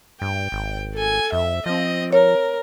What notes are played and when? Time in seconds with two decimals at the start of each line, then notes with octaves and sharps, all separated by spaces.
0.22 G2 G5
0.52 G#1
0.94 A4 G#5
1.32 F2 E5
1.66 F3 C4 D#5
2.13 A#4 C#5